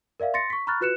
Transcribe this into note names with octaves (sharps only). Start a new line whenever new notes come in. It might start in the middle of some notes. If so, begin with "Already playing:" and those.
A#4 D5 E5 F5
C6 A6 A#6 C#7
C#6 B6
A#5 B5 C#6 F6 F#6 A6
F4 F#4 B4 F#6 C#7 E7